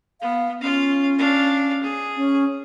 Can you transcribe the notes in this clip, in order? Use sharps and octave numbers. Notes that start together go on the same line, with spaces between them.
B3 F5
C#4 F4 F5
D4 F5
G#4
C#4